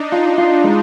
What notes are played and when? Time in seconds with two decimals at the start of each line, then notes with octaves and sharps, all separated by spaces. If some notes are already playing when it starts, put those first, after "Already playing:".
Already playing: D4 D#4
0.11 D#4 F4
0.38 F4
0.64 G#3